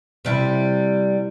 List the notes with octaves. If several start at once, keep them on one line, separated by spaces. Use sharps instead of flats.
C3 G3 E4